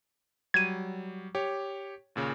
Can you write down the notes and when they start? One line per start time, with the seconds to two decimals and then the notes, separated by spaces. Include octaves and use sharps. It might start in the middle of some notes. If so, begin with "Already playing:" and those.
0.54 F#3 G3 G#6 D#7
1.35 G4 C#5
2.16 D#2 A#2 C#3